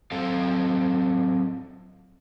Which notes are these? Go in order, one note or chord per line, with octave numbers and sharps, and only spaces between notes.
F#3 C4 A4 D#5 F5